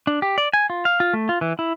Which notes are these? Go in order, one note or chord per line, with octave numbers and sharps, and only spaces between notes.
D4
G4
D5
G#5
F4
F5
F4
A3
F4
E3
E4